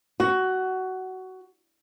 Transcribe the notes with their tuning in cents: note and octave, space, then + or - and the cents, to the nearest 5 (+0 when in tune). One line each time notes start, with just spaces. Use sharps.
F#4 +15